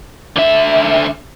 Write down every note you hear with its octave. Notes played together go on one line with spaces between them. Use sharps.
D3 E5